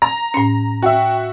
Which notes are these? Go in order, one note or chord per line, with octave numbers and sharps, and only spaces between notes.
A#5
A2 C#4
F#4 E5 G5